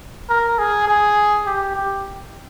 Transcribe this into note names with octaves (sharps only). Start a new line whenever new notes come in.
A#4
G#4
G#4
G4
G4